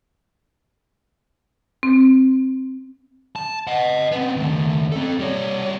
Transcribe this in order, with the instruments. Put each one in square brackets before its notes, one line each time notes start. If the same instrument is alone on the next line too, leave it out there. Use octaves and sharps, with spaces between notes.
[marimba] C4
[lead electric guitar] A5
D#5 F#5
B3 C4
D#2 A3
C4 A4
G3 C#5